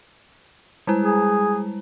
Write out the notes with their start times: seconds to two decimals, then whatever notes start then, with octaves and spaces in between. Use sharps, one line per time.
0.87 G3 G#3 E4
1.02 G#4